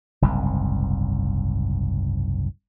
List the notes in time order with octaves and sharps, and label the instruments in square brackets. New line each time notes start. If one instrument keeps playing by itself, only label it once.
[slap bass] F#1 C2 G#2